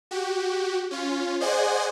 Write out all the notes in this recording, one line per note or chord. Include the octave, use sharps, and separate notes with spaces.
F#4 G4
C#4 F4
G#4 C5 D5 D#5 F#5 G#5